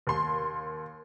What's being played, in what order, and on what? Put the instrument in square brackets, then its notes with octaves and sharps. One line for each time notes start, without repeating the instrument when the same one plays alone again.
[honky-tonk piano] D#2 C6